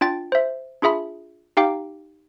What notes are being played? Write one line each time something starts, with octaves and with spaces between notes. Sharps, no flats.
D4 F4 G5 A6
C5 E5
D4 F4 G#4 E5 B5
D#4 G4 F5 G5 D6